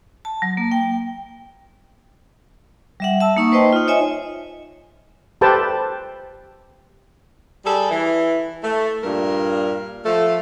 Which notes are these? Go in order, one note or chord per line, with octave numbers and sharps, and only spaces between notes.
A5
F#3
A#3
G5
G3 E5 F#5
E5 A5 E6
A#3 D#4 C#6
B4 C5 D#5 G5 A5 C6
D#4 F4
C#5 D#5 E5 G#5
G4 A4 B4 C5 G5 A5
G3 G#4 A4
E3
A3
G2 A#2 A#4
F3 A3